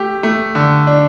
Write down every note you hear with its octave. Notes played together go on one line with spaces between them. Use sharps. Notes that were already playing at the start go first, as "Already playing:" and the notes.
Already playing: A3 G4
A3
D3
D4